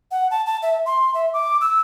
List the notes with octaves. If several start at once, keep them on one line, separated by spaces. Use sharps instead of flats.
F#5
A5
A5
E5
C6
E5
D6
E6